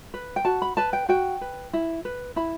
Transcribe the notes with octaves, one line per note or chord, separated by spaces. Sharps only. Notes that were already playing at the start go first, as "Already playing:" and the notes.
B4
G5
F#4 A5
B5
B4 A5
G5
F#4 G5
B4
E4
B4
E4 B5